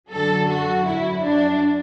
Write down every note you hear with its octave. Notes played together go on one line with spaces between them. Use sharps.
F#2 D3 F#3 A4
F#4
F#2 F#3 E4
D4